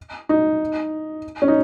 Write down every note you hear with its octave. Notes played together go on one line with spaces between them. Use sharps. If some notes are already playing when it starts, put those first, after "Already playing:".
D#4
C#4
D#4